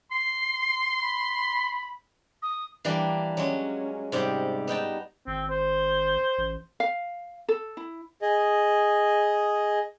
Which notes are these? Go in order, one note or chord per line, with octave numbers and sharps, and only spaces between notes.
C6 C7
B5
D#6
E3 G3 A#3 D4
F#3 G#3 C#4
G#2 C3 G3
B3 D#4 G5 A5
G#1 C4
C5
A1
F5
A4
E4
G#4 D#5